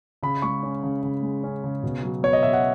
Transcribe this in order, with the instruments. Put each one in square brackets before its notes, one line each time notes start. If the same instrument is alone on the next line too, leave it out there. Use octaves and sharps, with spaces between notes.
[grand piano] C#3 B5
G#3 C#6
C#4
C#3
C#3
G#3
C#4
C#3
B2
F#3
B3 C#5
D#5
B2 E5
F#5